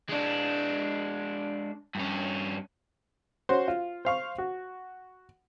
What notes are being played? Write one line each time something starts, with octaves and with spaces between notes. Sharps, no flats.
G#3 D4
G2 C#4
C#4 F#4 C5
F4
C5 F5 C#6
F#4